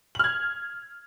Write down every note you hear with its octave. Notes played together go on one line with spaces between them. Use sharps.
F6 G#6 F#7